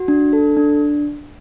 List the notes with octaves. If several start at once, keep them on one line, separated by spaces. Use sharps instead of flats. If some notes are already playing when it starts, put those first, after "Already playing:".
Already playing: F#4
D4
A4
D4